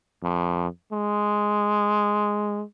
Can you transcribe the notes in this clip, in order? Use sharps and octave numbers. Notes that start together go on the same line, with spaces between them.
F2
G#3